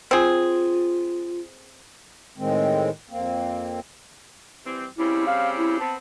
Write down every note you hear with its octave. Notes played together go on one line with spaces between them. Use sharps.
C4 F4 G#4
A2 D#3 G#3 C4
F2 A#3 C4
E3 G3 C4
C#3 G3 C4 E4
F5
E4
B3 C4 A5